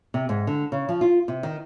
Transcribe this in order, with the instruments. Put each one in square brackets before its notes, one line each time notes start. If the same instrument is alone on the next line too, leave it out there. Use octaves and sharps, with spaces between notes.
[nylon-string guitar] C3
G#2
D3
C#3
F3
F4
C3
D#3